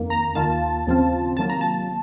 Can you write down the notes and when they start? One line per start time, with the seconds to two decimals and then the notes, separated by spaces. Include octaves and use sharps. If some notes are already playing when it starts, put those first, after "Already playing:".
Already playing: F2 D#3 A#3
0.10 A#5
0.35 D#2 D#3 A#3 F4 A5
0.87 D#2 C#3 F3 C4 F4
1.37 C3 D#3 F#3 A#3 F4 A5
1.50 A#5
1.61 A5